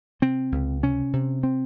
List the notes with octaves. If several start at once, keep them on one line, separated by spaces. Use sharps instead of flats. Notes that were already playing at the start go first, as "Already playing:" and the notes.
C3 C4
C#2
C3 C#4
C3
C4